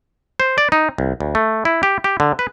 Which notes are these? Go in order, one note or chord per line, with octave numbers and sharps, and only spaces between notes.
C5
D5
D#4
C2
D2
A3
E4
G4
G4
D3
B4